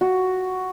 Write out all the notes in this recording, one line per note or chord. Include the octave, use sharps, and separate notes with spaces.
F#4